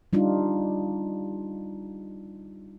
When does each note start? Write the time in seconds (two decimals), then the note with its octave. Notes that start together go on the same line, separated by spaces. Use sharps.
0.13 G3 D4 D#4 F4